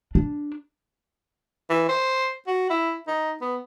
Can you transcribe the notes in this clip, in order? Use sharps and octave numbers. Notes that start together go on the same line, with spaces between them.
D4
E3
C5
F#4
E4
D#4
B3